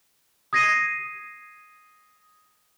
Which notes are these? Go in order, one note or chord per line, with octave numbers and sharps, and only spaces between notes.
D#6 G#6 A#6 C7 D#7